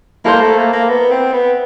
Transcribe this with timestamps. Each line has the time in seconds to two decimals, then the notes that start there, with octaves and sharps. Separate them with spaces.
0.25 A#3 E4 A4 C5
0.41 A3
0.57 A#3
0.73 A#3
0.89 B3
1.11 C4
1.33 B3